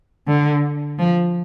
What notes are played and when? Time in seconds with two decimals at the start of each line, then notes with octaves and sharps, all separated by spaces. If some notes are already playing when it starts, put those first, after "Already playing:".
0.28 D3
0.99 F3